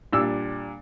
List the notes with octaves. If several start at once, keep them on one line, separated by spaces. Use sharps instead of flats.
A#2 G3 D4 E6